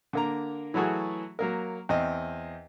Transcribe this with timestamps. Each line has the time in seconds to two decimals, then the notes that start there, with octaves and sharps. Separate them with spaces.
0.13 D3 A#3 A#5
0.74 E3 F#3 A3 F#4 G#4
1.39 F#3 A#3 A#4
1.89 E2 C4 D#5 G5